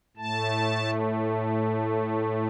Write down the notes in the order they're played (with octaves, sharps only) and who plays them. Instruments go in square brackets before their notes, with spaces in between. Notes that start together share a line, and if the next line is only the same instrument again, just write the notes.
[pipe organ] A2 A3 A5